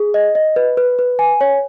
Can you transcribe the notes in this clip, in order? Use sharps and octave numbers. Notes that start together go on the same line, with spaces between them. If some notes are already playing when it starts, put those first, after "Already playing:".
Already playing: G#4
D#5
D#5
B4
B4
B4
G#5
C#5